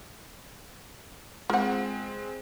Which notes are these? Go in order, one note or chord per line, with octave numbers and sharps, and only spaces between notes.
G#3 C4 F4 F#5